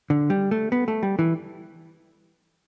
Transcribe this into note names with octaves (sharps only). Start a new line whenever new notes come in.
D3
G3
A3
B3
A3
G3
E3